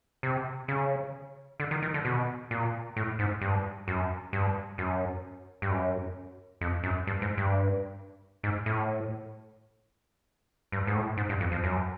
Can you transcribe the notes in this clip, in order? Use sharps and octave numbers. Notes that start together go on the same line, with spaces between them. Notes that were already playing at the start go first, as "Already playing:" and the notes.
C3
C#3
D3
D#3
D#3
D3
B2
A#2
A2
G#2
G2
F#2
G2
F#2
G2
F#2
F2
F#2
G2
G#2
G2
G#2
A2
G2
G#2
A2
G#2
G2
F2
F2
F#2